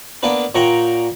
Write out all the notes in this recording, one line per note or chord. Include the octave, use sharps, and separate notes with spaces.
A#3 B3 D4 B4
A#2 C#5 F#5 G5 A#5